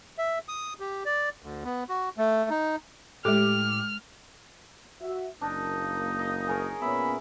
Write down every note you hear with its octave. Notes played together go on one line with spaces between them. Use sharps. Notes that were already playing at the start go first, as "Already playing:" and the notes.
E5
D#6
G4
D5
D2
B3
F#4
A3
D#4
A2 G#3 G4 A4 D6 F6
F#4 E5
F#1 A#3 D4 D#4
D#5
G#4 A#4 C#5
A#2 B3 C#4 E5 B5